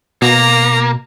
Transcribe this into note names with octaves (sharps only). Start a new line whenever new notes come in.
B2 A#3 A#5